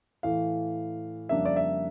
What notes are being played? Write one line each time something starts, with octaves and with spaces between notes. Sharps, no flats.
A2 E3 A3 E4 F5
F2 C#3 G3 A#3 D4 E5
D5
E5